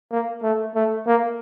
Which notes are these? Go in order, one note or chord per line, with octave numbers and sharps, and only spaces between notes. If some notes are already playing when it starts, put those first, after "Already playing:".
A#3
A3
A3
A#3